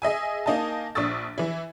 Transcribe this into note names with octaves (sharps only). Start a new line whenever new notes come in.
G#4 D#5 E5 G#5
A#3 D#4 D#5 G#5 A5
A#1 D4 C#6 D#6 E6 A6
E3 E4